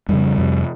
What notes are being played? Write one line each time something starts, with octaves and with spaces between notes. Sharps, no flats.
F2 C#3 G3
F2 C3